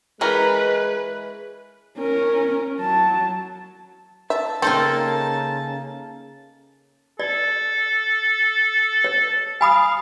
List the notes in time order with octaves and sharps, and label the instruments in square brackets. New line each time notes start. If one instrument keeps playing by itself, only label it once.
[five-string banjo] E3 C#4 A#4 [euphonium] G#3 [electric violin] B4
[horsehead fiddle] C#4 A#4
F#3 A5
[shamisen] E5 [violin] A5
[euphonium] C#3 [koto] A#3 D#4 A4 [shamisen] C4
[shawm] A4 [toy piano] D5
[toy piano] C#5
[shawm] F5 [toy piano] G#5 B5 D#6